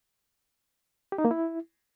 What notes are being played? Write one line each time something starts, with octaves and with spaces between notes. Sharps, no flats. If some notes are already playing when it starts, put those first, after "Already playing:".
G4
D#4
A#3
E4